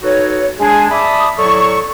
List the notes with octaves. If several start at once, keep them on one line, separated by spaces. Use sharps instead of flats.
D#4 F#4 A4 B4 C#5
G#3 D4 G#4
D5 E5 A5 B5 D6 D#6
A2 F#3 A4 D5 C#6